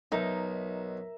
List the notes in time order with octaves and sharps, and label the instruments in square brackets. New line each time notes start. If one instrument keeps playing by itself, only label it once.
[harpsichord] B1 [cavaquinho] D#4 [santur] A#4 E5